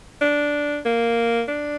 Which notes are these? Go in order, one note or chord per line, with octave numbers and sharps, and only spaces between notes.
D4
A#3
D4